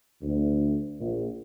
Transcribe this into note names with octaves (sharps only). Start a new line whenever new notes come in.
D2
A#1